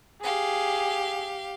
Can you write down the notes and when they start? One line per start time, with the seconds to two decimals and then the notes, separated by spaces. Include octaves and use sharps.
0.22 G4 G#4 F5